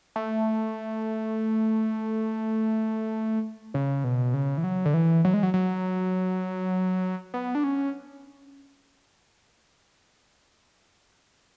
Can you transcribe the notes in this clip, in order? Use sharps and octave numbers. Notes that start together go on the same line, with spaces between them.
A3
C#3
B2
C#3
E3
F#3
D3
E3
F#3
G#3
F#3
F#3
B3
D4
C#4